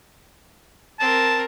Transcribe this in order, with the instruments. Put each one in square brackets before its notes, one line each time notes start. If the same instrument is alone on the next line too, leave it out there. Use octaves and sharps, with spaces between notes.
[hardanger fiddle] C4 A#4 [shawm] A5